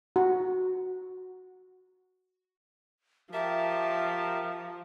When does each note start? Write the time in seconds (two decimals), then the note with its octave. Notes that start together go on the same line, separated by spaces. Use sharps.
0.16 F#4
3.33 F3 G4 A#4 E5 A5